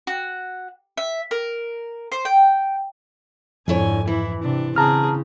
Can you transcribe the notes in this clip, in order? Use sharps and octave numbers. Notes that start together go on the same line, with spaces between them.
F#4
E5
A#4
C5
G5
F2 G#2 D3 E4 C#5 G#5
E3 E4
C3 D4
C#3 C4 G#4 A5 A#5 F6